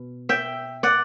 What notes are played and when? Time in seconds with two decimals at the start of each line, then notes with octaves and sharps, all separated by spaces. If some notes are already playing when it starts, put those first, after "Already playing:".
Already playing: B2
0.29 E5 G5
0.83 D5 F#5